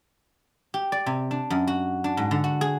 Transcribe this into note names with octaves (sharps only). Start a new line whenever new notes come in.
G4
D5
C3
D4
F#2
F#4
D4
G#2
D3
F#4
G#4